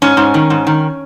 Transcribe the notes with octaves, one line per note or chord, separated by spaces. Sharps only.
G#2 C#4
G#2
D#3
G#2
D#3